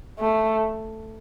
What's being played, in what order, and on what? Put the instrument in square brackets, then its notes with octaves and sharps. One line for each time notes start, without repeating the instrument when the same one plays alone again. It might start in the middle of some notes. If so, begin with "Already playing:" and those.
[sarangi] A3